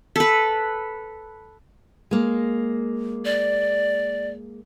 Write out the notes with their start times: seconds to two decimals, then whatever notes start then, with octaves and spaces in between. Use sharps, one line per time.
0.16 A4 B4
2.11 G#3 A#3
3.25 D5